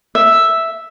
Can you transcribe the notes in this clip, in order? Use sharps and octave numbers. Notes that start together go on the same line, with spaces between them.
E5